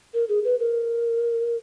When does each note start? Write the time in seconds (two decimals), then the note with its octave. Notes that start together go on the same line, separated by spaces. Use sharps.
0.14 A#4
0.29 G#4
0.45 B4
0.60 A#4